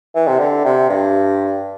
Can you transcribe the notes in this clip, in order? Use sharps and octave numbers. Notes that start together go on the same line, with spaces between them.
E3
C3
D3
C3
G2